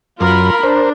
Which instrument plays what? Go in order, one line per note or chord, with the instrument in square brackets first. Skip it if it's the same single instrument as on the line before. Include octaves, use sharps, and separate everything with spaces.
[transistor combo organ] F#2 [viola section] F4 A#4 B5
[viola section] D4 [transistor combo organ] A#4 C5